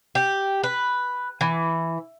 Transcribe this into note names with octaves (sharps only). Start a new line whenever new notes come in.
G4
B4
E3